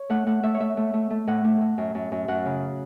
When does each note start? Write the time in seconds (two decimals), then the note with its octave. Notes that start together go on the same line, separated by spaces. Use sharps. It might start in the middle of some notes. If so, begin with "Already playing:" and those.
Already playing: C#5
0.10 A3 F#5
0.26 A3 F#5
0.43 A3 E5
0.54 C#5
0.60 A3 E5
0.77 A3
0.94 A3
1.10 A3
1.27 A2 F#5
1.44 A3
1.61 A2
1.78 F#2
1.95 F#2
2.12 F#2
2.28 F#2 F#5
2.45 C#3